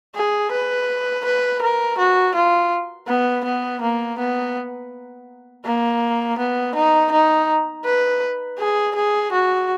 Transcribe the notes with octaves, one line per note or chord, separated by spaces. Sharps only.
G#4
B4
B4
A#4
F#4
F4
B3
B3
A#3
B3
A#3
B3
D#4
D#4
B4
G#4
G#4
F#4